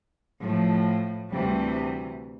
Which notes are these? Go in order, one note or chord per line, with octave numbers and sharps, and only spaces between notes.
A2 F3
D2 C3 E3 G3